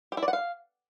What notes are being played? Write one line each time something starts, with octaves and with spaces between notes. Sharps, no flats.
G4
E4
D5
F#5
F5